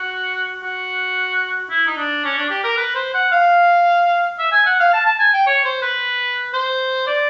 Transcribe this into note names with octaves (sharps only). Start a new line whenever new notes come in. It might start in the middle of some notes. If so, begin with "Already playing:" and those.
Already playing: F#4
F#4
E4
D#4
D4
C#4
D4
G4
A#4
B4
C5
F#5
F5
E5
G#5
F#5
F5
A5
A5
G#5
G5
C#5
C5
B4
C5
D5